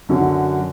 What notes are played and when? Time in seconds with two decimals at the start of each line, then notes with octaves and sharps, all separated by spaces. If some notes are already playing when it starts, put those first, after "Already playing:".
0.09 F#2 D3 F#3